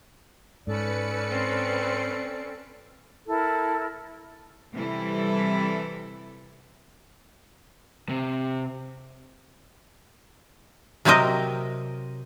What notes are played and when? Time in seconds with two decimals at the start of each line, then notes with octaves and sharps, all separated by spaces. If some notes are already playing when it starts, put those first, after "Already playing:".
0.67 G#2 C#4 A4 B4 D5 C#7
1.30 C4
3.27 E4 A4 A#4
4.73 C3 E3 G3 E4 A4
8.09 C3
11.05 C3 F#3 C4 G4 A#4 D#5